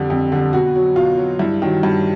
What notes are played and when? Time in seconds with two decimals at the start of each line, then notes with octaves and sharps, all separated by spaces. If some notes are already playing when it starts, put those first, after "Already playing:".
Already playing: F2 D3 G3
0.10 F2
0.32 D3 G3
0.53 B2 F#4
0.76 F#3
0.96 B2 F4
1.18 F#3
1.39 G2 E4
1.62 D#3 F#3
1.83 G2